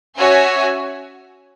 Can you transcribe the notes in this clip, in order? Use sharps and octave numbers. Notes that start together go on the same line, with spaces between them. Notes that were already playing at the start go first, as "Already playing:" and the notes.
C#4 F#4 C#5 E5 G#5